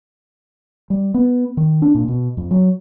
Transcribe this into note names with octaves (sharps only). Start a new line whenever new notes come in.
G3
B3
D#3
D4
A#2
B2
F2
F#3